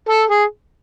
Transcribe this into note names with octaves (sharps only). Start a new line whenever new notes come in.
A4
G#4